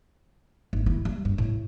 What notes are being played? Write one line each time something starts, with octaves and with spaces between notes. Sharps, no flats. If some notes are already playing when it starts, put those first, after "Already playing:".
G#1
D#3 E4
G3
G2
A2